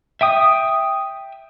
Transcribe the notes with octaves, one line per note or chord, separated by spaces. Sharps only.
E5 G5 D#6